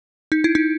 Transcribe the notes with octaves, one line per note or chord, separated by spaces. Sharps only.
D#4
E4
D#4